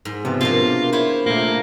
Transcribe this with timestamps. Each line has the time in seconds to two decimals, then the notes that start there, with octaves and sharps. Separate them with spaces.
0.05 G#2
0.25 C3 F3 B3
0.41 B2 A#3 D4 F4
0.93 E4 C5 C#5
1.26 A#2 A3 A#3